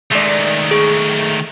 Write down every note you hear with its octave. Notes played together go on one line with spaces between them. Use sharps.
D#3 G#3 A3 D5
G#4